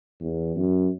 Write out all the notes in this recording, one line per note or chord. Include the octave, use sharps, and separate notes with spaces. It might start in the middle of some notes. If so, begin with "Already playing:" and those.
E2
F#2